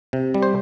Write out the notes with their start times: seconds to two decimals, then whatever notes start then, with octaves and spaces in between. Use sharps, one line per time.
0.13 C3
0.34 G3
0.42 C5